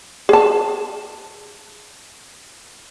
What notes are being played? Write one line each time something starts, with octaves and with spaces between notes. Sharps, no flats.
G#4 A5